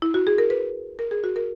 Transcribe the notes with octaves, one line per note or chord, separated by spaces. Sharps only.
E4
F#4
G#4
A#4
B4
A#4
G#4
F#4
A#4